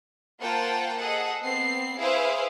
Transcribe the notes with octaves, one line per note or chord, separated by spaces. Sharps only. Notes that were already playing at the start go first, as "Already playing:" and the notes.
A#3 F4 C5 F#5 G5 A5
G#4 A4 D#5 F#5
B3 C4 C7
E4 G#4 B4 C5 E5 F5